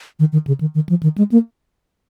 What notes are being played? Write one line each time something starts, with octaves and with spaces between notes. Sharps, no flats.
D#3
D#3
C#3
D#3
D#3
F3
D#3
G#3
A#3